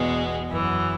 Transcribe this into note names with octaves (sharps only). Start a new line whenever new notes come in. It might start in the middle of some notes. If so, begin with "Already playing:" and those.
Already playing: E2 B2 G#3 B3
F#2 E3 B3